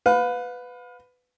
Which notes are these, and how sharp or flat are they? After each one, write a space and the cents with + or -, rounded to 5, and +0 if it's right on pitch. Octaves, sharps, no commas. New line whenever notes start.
B4 +15 F5 +40